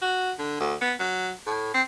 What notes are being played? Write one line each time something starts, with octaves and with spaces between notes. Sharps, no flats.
F#4
D3
D2
B3
F#3
A2
C4